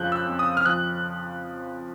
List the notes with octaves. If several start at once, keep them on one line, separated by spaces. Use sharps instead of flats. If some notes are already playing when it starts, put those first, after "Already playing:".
Already playing: F2 C#3 F3 F#6 G6
E6
F2
D#6
F6
F3 F#6